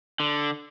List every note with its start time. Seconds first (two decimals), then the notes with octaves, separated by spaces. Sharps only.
0.20 D3